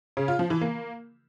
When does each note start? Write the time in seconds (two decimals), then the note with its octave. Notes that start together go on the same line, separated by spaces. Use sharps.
0.17 C#3
0.28 F4
0.39 F3
0.50 E3
0.61 A#3